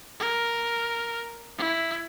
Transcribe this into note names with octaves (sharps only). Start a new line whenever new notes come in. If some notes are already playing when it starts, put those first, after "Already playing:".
A#4
E4